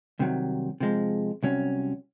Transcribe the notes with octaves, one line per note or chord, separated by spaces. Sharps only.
C2 C3 D#3 F#3
C3 F3 G#3
C2 C3 F#3 C#4